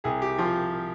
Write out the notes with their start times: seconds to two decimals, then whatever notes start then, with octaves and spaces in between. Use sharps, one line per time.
0.04 C2 G#4
0.22 G4
0.38 F3 F4